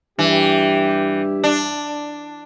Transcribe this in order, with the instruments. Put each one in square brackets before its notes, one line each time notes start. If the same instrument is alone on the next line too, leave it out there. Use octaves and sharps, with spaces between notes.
[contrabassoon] G2 [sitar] E3 [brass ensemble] G4
[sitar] D4